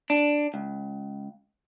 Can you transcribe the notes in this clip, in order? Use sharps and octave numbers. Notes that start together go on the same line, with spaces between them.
D4
C#2